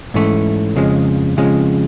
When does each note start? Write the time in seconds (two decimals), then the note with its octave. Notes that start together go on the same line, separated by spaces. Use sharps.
0.14 G#2 E3 A3 C#4
0.76 F2 C#3 F3 G#3
1.37 F2 C#3 F3 G#3